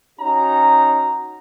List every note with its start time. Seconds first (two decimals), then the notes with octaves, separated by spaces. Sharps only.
0.20 C#4 D#4 F#4 A#5